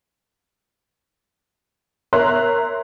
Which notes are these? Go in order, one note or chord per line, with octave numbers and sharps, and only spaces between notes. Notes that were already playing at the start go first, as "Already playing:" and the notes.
A#4 C#5 E5 A#5 C6 F#6